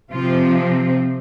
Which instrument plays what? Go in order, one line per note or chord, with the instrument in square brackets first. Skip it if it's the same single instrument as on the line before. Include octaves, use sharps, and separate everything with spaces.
[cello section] C3 F3 C4 F4